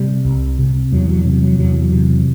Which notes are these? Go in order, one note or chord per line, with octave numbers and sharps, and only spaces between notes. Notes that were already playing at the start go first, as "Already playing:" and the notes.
Already playing: C3 G3
C2
C3
E2 F#3
F#3
C3 F#3
F#3
E2 F#3
C3